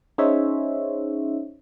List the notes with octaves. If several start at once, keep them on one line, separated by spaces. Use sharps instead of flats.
C#4 D#4 G#4 C5 C#5 E5